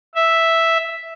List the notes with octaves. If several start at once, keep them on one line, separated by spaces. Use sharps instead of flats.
E5